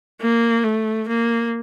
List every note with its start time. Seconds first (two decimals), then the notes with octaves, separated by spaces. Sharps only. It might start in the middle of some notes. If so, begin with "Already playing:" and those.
0.21 A#3
0.64 A3
1.09 A#3